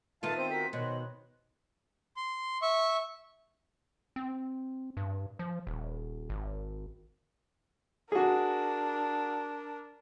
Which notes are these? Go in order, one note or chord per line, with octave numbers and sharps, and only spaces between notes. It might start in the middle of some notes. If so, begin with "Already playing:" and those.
D#3 B3 F4 A4 E5 F5 A5 D#7
C4 C5
F#4 A#4 G5 B6
B2 D#3 C5 C#5 D#5 F#6
C6
E5 C#6
C4
G2
F3
D#1
G#1
D4 F#4 G#4 A#4